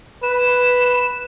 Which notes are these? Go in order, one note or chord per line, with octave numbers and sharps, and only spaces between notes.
B4 E7